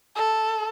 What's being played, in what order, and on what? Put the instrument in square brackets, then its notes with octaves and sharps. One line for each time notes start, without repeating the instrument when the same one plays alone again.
[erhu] A4